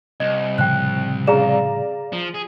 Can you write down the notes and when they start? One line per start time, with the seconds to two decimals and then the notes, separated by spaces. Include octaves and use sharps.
0.20 C2 D#5
0.58 A2 C#3 F3 G5 F#6
1.27 G#4 D5 F5 A#5 E7
2.13 F3
2.34 G#4